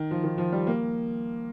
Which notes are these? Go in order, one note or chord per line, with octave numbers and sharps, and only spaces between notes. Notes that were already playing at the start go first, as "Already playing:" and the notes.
Already playing: D#3
F3
D#3
F3
G3
A#3